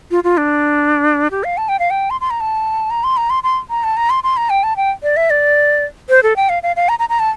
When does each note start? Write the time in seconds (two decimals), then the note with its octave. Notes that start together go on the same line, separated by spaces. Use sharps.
0.11 F4
0.24 F4
0.37 D4
1.31 G4
1.44 F5
1.57 A5
1.69 G5
1.79 F5
1.90 G5
2.10 C6
2.21 C6
2.30 A#5
2.41 A5
2.91 A#5
3.04 C6
3.17 A#5
3.30 C6
3.43 C6
3.70 A#5
3.84 A5
3.97 A#5
4.10 C6
4.24 C6
4.37 A#5
4.50 G5
4.63 A5
4.77 G5
5.03 D5
5.17 E5
5.30 D5
6.09 C5
6.23 A4
6.36 G5
6.49 F5
6.63 F5
6.76 F5
6.89 A#5
6.99 A#5
7.09 A#5
7.19 A5